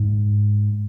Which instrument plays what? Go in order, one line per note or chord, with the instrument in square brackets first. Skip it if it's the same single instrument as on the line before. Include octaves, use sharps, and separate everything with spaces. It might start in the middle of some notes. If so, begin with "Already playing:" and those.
Already playing: [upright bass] G#2